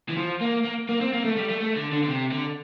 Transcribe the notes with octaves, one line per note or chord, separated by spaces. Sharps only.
E3
F3
A#3
A#3
A#3
C4
A#3
A3
G3
A3
A3
D3
D3
D3
C3
D3